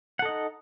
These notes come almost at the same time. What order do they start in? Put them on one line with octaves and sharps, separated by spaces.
F#5 A4 D#5 D#4